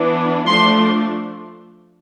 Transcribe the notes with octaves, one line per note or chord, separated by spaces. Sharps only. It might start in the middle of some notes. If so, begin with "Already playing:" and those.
Already playing: E3 B3 D4
F3 A3 D4 C6